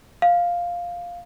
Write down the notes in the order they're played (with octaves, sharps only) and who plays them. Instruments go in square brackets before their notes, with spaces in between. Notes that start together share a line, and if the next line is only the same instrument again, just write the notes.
[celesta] F5